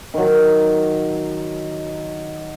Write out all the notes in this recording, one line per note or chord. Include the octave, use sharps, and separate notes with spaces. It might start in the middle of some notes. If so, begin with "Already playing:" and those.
D#3 F#3